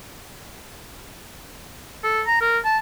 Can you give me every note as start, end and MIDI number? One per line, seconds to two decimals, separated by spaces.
2.04 2.21 69
2.27 2.40 82
2.41 2.58 70
2.65 2.78 81